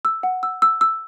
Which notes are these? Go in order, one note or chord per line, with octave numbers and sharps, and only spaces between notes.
E6
F#5
E6
E6
E6